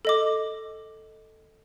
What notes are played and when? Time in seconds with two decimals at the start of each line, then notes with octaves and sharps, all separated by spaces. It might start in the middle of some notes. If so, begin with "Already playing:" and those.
0.05 A4 D#5 D6